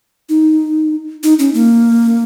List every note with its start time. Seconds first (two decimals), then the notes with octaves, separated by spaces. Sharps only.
0.29 D#4
1.23 D#4
1.39 C#4
1.54 A#3